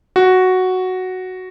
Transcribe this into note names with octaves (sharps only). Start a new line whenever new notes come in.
F#4